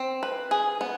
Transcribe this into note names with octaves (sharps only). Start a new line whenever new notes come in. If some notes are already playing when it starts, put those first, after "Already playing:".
Already playing: C4
B4
G#4
B3